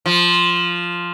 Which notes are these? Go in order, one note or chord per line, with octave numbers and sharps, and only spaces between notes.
F3